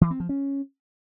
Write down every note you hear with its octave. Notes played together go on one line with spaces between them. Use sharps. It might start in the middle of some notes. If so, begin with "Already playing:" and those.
E3
C4
F3
C#4